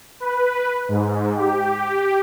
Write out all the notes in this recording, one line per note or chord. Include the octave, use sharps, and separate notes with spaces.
B4
G#2
G4